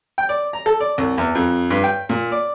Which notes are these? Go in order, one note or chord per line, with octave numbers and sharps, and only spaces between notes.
G5
D5
A#5
A4
D5
C2
E2
F2
G2
G5
A#2
D5